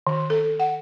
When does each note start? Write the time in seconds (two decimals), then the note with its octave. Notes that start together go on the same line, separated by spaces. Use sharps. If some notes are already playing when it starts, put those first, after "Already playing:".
0.07 D#3
0.30 A4
0.60 F#5